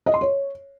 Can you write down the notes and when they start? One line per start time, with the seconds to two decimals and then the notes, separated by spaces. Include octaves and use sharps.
0.06 D#5
0.14 C6
0.21 C#5